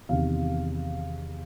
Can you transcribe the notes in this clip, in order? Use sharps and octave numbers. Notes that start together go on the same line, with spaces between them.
E2 C3 D#3 F5